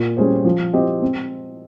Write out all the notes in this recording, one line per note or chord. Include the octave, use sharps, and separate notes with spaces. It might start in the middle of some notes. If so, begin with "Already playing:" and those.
Already playing: A#2
G3 C#4 G#4 C5
F3
C4 G4 C5 D#5
C4